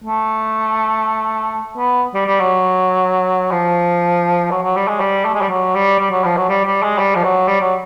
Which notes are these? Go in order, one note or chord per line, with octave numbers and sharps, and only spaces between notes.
A3
B3
G3
G3
F#3
F3
F#3
F#3
G3
G#3
G3
A3
G#3
G3
F#3
G3
G3
F#3
F3
F#3
G3
G3
G#3
G3
F3
F#3
G3
F#3